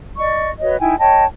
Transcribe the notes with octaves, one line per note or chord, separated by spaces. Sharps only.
D5 D#5 C#6
F#4 B4 C#5 D#5
D#4 E4 G5 G#5
C#5 D#5 G5 A5